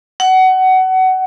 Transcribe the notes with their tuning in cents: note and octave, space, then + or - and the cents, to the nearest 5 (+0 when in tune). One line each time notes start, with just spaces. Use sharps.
F#5 +20